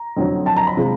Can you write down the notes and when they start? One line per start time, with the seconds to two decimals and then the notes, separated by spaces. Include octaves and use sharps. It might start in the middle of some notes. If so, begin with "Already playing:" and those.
Already playing: A#5
0.17 F2 D3 F#3
0.46 A5
0.56 A#5
0.67 B5
0.77 C3 F3 G#3